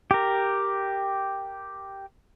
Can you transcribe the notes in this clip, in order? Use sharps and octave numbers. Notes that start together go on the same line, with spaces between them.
G4 A#4